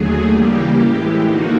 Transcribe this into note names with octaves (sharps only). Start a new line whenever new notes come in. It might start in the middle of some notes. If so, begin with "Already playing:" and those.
Already playing: D#2 D3 F#3 A3 G#4
C#3 E3 G3 A#3 G4
A2 E3 G#3
D3 F3 A#3 D#4 F#4